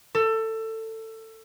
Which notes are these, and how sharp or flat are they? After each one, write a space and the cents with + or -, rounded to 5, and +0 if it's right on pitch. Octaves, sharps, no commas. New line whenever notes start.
A4 +20